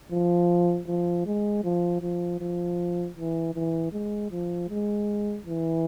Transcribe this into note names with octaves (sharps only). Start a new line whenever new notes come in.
F3
F3
G#3
F3
F3
F3
E3
E3
G#3
F3
G#3
E3